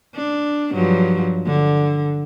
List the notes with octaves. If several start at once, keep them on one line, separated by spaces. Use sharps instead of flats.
D4
G2 F3 F#3
D3